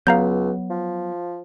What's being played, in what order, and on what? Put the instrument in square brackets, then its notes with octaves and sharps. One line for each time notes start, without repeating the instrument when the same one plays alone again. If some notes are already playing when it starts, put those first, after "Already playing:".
[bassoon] C#2 [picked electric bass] F#3 B3 [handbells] F5 A#5 G6
[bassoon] F3